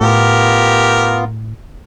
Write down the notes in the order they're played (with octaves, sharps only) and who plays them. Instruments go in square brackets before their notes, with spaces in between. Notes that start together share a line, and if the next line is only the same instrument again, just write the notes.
[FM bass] A2 [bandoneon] B3 F4 [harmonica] G4 A#4